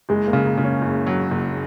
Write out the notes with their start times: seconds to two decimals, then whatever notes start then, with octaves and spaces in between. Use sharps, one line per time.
0.09 F#1 G#3
0.27 A#3
0.33 C#3
0.46 A#3
0.57 C#3
0.64 C#4
0.82 F#1
1.07 F#3
1.31 F#1